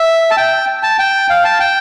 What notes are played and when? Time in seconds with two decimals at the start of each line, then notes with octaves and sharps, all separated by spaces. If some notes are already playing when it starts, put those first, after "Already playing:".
Already playing: E5
0.31 A5
0.37 G5
0.83 A5
0.99 G5
1.30 F5
1.45 A5
1.60 G5